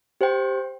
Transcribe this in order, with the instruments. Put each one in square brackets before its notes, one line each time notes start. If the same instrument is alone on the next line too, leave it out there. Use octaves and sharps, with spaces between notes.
[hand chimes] G4 C5 G5